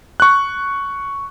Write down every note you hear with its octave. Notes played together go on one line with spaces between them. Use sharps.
C#6 F#6